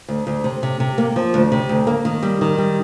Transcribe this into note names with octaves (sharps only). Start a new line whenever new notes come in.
D2
D2
C3
C3
C3
A#3
F3
D2
C3
D2
A#3
D#3
G3
D#3
G3